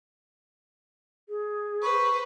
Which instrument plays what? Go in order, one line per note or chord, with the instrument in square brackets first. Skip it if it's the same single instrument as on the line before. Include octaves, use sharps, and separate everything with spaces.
[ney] G#4
[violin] B4 C5 [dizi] C#6